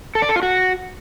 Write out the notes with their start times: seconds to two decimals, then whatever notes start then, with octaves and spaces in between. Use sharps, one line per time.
0.15 A4
0.22 D5
0.29 A4
0.36 F4
0.43 F#4